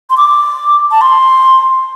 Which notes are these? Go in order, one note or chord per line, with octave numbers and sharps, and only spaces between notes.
C6
D6
A5
C6